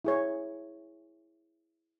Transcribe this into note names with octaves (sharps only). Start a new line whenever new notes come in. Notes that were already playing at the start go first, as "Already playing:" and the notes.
E4 G#4 C#5